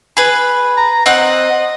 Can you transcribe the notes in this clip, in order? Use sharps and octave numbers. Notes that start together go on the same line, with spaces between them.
G#4 B4
A#5
C4 D#5 F#5 F#6